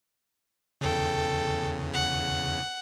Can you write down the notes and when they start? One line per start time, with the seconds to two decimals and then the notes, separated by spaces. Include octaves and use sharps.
0.81 E2 C#3 A4 G5
1.94 F#5